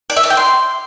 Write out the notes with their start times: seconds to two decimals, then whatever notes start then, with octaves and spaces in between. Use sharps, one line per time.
0.10 D5
0.17 E5
0.23 D5
0.30 G5
0.37 C6